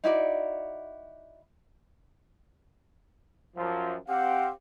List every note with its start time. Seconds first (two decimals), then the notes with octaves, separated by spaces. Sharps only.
0.04 D#4 E4 F#4 D5
3.56 F#2 F3
4.08 C4 G4 F5 F#5